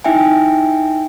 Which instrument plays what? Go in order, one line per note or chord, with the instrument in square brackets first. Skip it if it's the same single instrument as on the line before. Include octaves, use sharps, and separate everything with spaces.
[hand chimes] D#4 E4 E5 G5 G#5